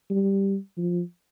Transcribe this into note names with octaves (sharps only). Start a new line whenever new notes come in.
G3
F3